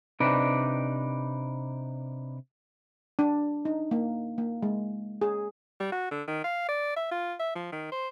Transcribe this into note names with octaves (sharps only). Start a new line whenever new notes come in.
C3 D4 D#4 B4 D5
D4
D#4
A#3
A#3
G#3
G#4
G3
F#4
D3
D#3
F5
D5
E5
F4
E5
F3
D#3
C5